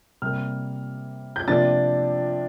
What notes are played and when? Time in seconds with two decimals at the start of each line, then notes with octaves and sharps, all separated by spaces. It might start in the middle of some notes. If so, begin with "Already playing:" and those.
0.22 C3 G3 A#3 F6
1.36 G6
1.48 C3 F3 A#3 D4 A6